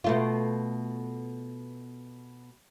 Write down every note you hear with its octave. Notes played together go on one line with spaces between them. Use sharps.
B2 A3 F4